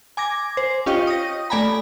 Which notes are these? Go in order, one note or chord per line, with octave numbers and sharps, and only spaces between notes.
G#5 D6 G#6 A#6
C5
C#4 F4 G4 C#5 D#5 G5
D#6 A#6
A3 D5 G#5 A#5 B5